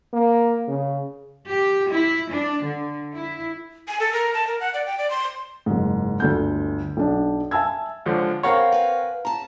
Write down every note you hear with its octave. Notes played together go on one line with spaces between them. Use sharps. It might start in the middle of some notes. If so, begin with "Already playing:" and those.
A#3
C#3
G4
E4
D4
D3
E4
G#5
A4
A#4
A5
A#4
F#5
D5
G5
D5
C6
F#1 G#2
G1 D2 G6
B1 D4
E5 G#5 A5 E6 G#6
C#2 D3 F3
C4 A#4 C#5 F5 F#5 B5
B4 G#5
C#4 A5 A#5